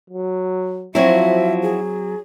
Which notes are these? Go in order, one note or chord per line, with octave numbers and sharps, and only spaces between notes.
F#3
F3 F#3 C4 E4 F#4 E5
G#4